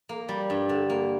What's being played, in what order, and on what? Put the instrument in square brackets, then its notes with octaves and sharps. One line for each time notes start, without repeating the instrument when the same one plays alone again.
[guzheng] A#3
G3
G2
D3
A#3